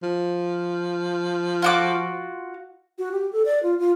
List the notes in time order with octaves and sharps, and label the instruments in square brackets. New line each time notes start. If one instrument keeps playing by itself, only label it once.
[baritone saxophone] F3
[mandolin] F4 F#4 D6
[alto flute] F#4
G4
A4
D5
F4
F4